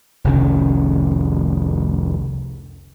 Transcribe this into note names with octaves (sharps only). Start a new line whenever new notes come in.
F1 C2 D#3 C#4